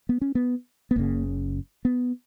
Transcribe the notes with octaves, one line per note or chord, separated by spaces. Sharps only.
B3
C#4
B3
B3
F#1 F#2 C#3 A#3
B3